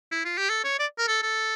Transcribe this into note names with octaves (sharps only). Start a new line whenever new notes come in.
E4
F4
G4
A4
C#5
D5
A#4
A4
A4